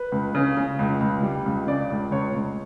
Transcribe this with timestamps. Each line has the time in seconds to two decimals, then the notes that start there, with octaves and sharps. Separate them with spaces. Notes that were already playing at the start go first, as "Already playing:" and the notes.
Already playing: B4
0.12 C#2
0.35 C#3
0.57 C#3
0.79 C#2
1.01 C#2
1.23 G3
1.46 C#2
1.67 C#3 D5
1.90 C#2
2.11 C#2 C#5
2.35 C#2